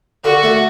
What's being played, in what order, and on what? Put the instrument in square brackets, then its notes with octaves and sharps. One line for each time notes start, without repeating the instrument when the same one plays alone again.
[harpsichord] D3 [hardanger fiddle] F#4
[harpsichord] A3